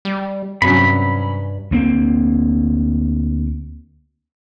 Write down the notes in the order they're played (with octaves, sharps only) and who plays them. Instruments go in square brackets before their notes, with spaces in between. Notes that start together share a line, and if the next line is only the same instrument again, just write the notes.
[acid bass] G3
[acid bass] G2 [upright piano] C3 F#3 C#4 [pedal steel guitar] B5
[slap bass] D2 A#3 C4